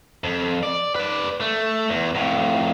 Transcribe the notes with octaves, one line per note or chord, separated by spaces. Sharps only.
F2
D5
B4 D5
A3
E2
F2 A2